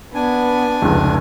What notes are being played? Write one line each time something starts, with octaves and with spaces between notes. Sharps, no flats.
B3 D4 G#5
F1 C#2